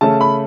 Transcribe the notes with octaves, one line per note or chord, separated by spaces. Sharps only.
C#3 A3 C#4 A5
B5